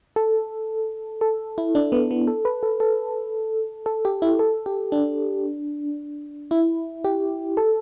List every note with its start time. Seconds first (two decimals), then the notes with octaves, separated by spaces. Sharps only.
0.16 A4
1.21 A4
1.58 E4
1.75 D4
1.92 B3
2.11 B3
2.28 A4
2.45 B4
2.63 A4
2.80 A4
3.86 A4
4.05 G4
4.22 E4
4.39 A4
4.66 G4
4.92 D4
6.51 E4
7.04 G4
7.57 A4